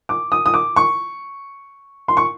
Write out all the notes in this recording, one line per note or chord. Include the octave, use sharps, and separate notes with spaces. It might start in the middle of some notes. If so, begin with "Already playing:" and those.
D6
D#6
D#6
D6
C#6
C6
C#6